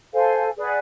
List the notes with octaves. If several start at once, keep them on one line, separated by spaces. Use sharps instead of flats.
A4 C5 F5 G#5
G#4 B4 D5 F#5